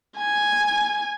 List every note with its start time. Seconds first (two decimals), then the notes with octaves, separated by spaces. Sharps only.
0.18 G#5